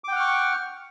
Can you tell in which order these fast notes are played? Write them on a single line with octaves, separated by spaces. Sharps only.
D6 G5 F#5 F6 C#6